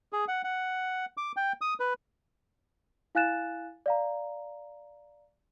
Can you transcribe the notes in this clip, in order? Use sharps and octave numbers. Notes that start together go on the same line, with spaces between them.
G#4
F#5
F#5
D6
G5
D#6
B4
E4 F5 G#5 F#6 A6 E7
D5 F5 A#5